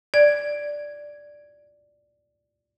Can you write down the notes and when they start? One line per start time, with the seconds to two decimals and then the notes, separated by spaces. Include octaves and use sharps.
0.14 D5 G#6